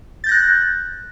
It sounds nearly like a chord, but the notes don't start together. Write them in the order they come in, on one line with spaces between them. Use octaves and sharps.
A6 G6 A#6 F#6